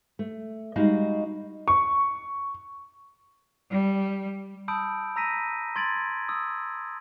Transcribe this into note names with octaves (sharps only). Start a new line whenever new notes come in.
A3
G3 G#3 D#4 F#4 F5
C#6
G3
A5 B5 D#6 E6 G6 D7
A#5 E6 A#6 B6 D#7
C6 G#6 A6 D7 F#7
D#6 E6